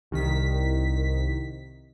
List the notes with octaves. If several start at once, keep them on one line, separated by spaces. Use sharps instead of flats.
C2 D#3 B6